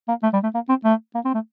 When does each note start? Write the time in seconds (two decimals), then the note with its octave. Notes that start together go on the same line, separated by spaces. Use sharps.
0.08 A#3
0.23 A3
0.33 G3
0.43 A3
0.54 A#3
0.69 C4
0.84 A3
1.15 A#3
1.25 C4
1.34 A3